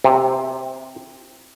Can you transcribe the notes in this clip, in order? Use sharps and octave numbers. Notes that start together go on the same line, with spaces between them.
C3